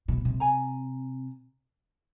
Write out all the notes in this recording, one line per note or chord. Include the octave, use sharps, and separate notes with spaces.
B2
C3
G#5 A#5